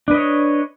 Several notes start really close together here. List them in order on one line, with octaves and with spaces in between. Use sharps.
D4 B4 D#5 C#5